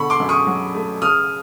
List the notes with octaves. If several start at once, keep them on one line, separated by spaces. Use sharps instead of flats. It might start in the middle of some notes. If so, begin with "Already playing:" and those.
Already playing: B2 D3 B5 C#6
C6 D6
F#2
C#6 D#6
F#3
A3
C#3 D#6 F6